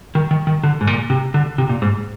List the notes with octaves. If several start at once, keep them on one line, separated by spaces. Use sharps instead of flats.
D#3
D#3
D#3
D3
G#2
A#2
C3
D3
C3
A#2
G#2